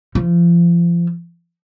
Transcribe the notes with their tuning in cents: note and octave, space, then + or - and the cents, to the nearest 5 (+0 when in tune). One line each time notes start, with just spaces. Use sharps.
F3 -30